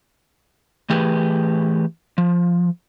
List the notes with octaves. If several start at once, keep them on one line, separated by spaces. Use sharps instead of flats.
E3 A3 G4 G#4 B4
F3